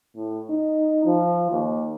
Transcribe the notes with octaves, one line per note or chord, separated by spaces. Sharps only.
A2
D#4
F3
D#2